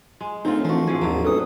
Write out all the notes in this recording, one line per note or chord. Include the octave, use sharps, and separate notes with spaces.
G#3
D1 C4 D#4 F4
E3 F3 F#4
A2 F3 G#4
A#1 D#2 G#2 F#3
A1 A4 B4 D#6